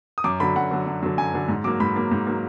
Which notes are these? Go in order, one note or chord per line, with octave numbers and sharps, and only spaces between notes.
D#6
F#2 D6
D3 F#3 B5
F#2 F#5
D3 F#3
F#2
D3 F#3
F#2 G#5
D3 F#3
G#2
F#3 A#3 D6
G#2 B5
F#3 A#3
G#2
F#3 A#3